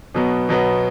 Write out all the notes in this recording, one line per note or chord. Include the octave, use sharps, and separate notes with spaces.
B2 F#3 B3
B2 F#3 B3